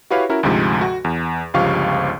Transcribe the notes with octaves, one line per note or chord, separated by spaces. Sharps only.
E4 F#4 G4 B4 C#5 F5
C#4 E4 F#4 A#4
D2 G#2 C3 F3 G#3
F#4
E2
G1 C#2 F3 G4 F5 C#6